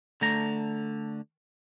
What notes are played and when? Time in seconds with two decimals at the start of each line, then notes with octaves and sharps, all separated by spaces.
0.21 D3 A3 A#5